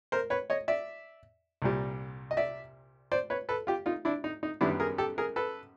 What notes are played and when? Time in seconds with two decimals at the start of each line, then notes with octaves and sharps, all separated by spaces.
0.12 A#4 C5
0.30 B4 C#5
0.50 C#5 D#5
0.68 D5 E5
1.62 C2 A#2 G3
2.31 D#5
2.37 D5 E5
3.12 C5 D5
3.30 B4 C#5
3.49 A4 B4
3.67 F4 G4
3.86 D#4 F4
4.05 D4 E4
4.24 D#4
4.43 D#4
4.61 F#2 D#3 G3 B3 D4 E4
4.80 G#4 A#4
4.98 G4 A4
5.18 G#4 A#4
5.36 A4 B4